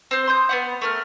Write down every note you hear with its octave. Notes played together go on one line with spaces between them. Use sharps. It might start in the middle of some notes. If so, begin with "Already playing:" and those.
C4 C5
C6 D#6 G6
B3 C#4 F#5
A3 A#4 F6